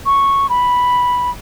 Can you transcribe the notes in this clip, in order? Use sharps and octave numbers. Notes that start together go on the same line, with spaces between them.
C#6
B5